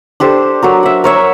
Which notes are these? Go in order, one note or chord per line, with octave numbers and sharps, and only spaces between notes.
D4 G4 A4 C5
F#3 F#4 A#4
E5 F#5
A#4 C#5 E5